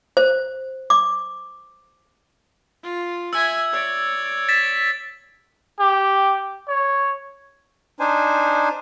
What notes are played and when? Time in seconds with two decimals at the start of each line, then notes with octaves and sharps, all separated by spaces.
0.17 C5
0.90 D6
2.83 F4
3.33 E5 G#5 E6 G#6
3.73 C#5 D5
4.49 A6 B6 E7
5.80 G4
6.68 C#5
8.00 D4 D#4 C5 G#5